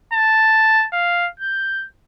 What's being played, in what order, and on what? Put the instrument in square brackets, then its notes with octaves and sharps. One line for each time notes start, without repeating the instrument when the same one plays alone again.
[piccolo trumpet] A5
F5
G6